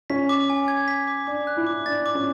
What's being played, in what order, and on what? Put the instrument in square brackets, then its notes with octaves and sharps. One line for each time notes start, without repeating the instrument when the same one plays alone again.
[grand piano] C#4 [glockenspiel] B6
[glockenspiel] D6
G#5
G#6
B6
D6
[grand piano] D4 [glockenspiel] D6
[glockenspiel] F#6
[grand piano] E4
[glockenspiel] D6
[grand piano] D4 [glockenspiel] A6
[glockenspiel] D6
[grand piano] C#4